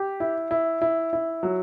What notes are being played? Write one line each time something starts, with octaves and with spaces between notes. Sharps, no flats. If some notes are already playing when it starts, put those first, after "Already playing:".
Already playing: G4
E4
E4
E4
E4
F#3